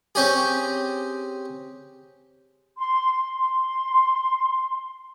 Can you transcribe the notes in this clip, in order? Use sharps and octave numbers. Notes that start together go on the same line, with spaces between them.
C4 C#4 G4 G#4
C6
C6